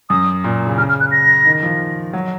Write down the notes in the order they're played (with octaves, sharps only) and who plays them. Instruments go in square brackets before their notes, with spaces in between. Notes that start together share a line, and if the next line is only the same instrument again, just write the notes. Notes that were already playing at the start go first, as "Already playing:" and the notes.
[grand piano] F#2 [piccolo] D#6
[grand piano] A#2
C#3
[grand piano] C#3 [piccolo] F6
[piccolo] F6
F#6
A#6
[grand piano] D#3
F3
F#3